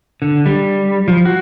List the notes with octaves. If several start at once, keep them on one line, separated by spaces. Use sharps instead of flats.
D3
G3
F3
F#4